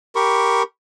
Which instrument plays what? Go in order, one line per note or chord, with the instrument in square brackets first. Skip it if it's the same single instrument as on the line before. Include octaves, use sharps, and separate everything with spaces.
[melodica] G4 A#4 B5 C#6